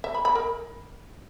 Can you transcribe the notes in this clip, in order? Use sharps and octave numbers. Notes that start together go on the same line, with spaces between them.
E5
B5
B5
A#4